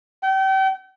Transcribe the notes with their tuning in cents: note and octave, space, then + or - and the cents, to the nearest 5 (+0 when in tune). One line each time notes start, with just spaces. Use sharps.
G5 -35